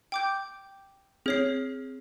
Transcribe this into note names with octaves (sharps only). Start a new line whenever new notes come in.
G5 D6 G6
C4 G#4 C#5 C7